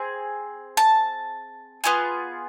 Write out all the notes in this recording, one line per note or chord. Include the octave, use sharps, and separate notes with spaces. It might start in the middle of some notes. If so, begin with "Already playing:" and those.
Already playing: C4 G#4
A5
B3 F4 G#4